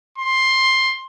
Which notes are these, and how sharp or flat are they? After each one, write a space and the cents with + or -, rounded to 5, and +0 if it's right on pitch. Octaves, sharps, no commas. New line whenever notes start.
C6 +10